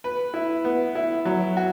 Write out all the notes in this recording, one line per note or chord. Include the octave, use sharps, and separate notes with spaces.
B4
E4
B3
E4
F#3
F#4